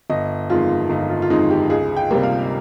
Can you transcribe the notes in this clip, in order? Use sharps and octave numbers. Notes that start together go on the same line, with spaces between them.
G1 D#5
F2 D#3 G#3 F4
G1 D#4
F4
F4
F2 D#3 G#3 D#4
G4
C#2 G#4
G5
C3 G3 A#3
F5